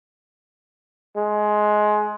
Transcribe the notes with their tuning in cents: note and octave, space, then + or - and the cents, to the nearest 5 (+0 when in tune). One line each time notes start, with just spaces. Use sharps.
G#3 +20